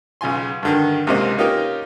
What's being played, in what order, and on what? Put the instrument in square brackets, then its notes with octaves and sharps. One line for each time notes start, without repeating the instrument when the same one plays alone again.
[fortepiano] B1 C#3 F4 G#5 C6
G2 D3 D#3
C#2 G#2 C3 A#3 C5 D#5
A#3 C#4 D#4 F4 G4 A#4